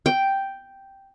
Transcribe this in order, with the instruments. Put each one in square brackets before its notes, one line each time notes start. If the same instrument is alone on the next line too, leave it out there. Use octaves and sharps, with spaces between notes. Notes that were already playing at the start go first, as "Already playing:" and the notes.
[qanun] G5